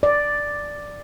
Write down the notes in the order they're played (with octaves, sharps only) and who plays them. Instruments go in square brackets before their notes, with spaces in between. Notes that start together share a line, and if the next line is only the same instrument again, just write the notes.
[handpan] D5